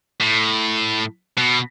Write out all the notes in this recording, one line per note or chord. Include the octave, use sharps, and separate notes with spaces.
A2
B2